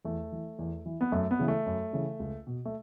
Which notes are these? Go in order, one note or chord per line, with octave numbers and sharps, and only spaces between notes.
E2 A3
E3
E2
E3
B3
F#2 A3
B3
C#3 E3
A3
F#2
C#3 E3
C#2
B2
A3